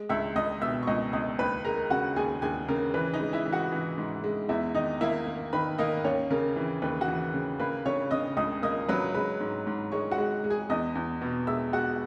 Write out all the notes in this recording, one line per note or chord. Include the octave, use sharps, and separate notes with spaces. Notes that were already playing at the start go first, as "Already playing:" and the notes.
Already playing: G#3
C#2 E5 E6
C#2 D#5 D#6
B2 E5 E6
C#6
C#2 D#5 D#6
C#2 D#5 D#6
D#2 B4 B5
G#3 A#4 A#5
C#3 F#4 F#5
D#2 G#4 G#5
D#2 G#4 G#5
C#3 A#4
E3 B4
D#4 D#5
G#3
E4 E5
E3
F#4 F#5
E3
G#2
G#3
E2 E4 E5
D#3 D#4 D#5
A#3 E4 E5
A#3
D#3 B4 B5
A#3 D#4 D#5
D#2 C#4 C#5
C#3 A#4
E3
D#2 B4
F#4 F#5
E3
C#3
A#3 B4 B5
C#3 C#5 C#6
C#3 D#5 D#6
C#2 D#5 D#6
A#3 D#5 D#6
F#3 B4 B5
G#3 B4 B5
G#2
G#2
G#3 C#5 C#6
F#4 F#5
G#3
G#3
G#4 G#5
E2 D#5 D#6
E2
B2
G#3 E5 E6
G#3 F#4 F#5